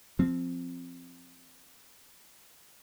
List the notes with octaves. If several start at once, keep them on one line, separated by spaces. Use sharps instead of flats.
F3 C4